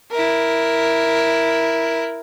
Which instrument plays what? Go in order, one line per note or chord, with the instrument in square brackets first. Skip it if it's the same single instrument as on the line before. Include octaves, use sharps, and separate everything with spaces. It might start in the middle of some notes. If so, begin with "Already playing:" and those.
[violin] E4 A#4